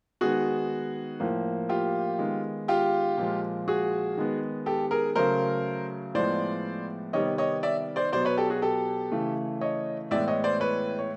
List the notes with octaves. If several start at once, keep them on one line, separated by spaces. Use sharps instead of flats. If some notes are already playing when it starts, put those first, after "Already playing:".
D#3 G#3 B3 F#4 G#4
A2 F3 A#3
F4 G4
D#3 G#3 B3
F4 G4
A#2 F3 G#3
F#4 G#4
D#3 G#3 B3
G4 A4
G#4 A#4
C#3 F#3 A3 A#4 C5
A2 F3 G#3 B3 C5 D5
C3 D#3 G3 B3 C#5 D#5
C#5 D#5
D5 E5
C5 D5
B2 F#3 B3 C5 D5
B4 C#5
G4 A4
F#4 G#4
G4 A4
C#3 E3 A3
C#5 D#5
A2 E3 G#3 B3 D5 E5
C#5 D#5
C5 D5
B4 C#5
C#5